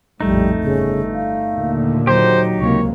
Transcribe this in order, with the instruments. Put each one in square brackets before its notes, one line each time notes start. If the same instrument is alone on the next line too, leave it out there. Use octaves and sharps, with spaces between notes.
[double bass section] A#1 F2 A2 [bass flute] G3 [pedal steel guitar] A3 D#4
[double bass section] G1 [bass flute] C#3
[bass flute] F5
[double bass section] D#2 A#2 D3
[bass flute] F#3 [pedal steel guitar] D#4 G4 [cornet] C5
[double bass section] C#2 C3 A#3 [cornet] C#5